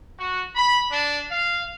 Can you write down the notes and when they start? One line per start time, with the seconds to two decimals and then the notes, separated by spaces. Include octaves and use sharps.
0.18 F#4
0.54 B5
0.91 D4
1.30 F5